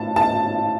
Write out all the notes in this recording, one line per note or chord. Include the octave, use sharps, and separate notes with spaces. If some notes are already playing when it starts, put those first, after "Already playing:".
Already playing: A2 A5
A5